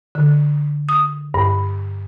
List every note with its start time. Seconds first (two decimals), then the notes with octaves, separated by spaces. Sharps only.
0.15 D3
0.89 D#6
1.34 G2